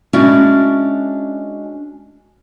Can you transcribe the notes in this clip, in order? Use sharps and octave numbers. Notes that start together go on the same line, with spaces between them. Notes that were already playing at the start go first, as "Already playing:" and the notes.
G#3 C#4 D4 E4 F#4 D5